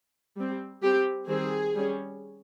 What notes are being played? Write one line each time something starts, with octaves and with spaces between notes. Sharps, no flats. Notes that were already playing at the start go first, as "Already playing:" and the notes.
G3 C4
G3 C4 G4
D#3 G3 C4 G#4
G3 C#4